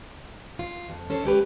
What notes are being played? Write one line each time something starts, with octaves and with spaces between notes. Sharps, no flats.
F4
F2
C#4 A4 C5
G#3 C#4 G4 B4